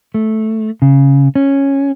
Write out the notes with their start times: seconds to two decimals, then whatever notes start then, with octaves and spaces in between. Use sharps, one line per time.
0.14 A3
0.82 C#3
1.35 C#4